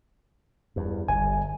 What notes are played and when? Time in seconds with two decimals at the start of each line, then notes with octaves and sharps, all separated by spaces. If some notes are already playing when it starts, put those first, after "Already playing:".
0.76 E2 G2
1.09 G1 G#5